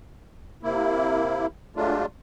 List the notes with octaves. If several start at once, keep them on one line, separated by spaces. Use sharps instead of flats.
C3 A#3 E4
F#3 G#3 A3 D4 F4